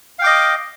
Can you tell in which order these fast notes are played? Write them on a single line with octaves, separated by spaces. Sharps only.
F5 G5 D6 D#5